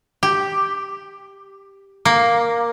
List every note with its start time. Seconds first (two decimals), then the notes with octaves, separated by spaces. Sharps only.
0.23 G4
2.05 A#3